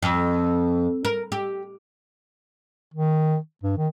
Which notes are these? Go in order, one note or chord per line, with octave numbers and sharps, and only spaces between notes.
F2
A#4
G4
D#3
G2
D#3